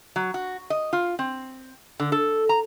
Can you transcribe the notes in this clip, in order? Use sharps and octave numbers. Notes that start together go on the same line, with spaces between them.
F#3
F#4
D#5
F4
C4
D3
A4
A#5